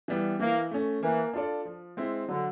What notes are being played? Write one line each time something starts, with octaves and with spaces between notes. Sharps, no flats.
E3 G3 B3
E3 A#3
A3 C#4
E3 A#3
D4 F4 A4 D5
F3
G#3 C4 E4
D3 F#3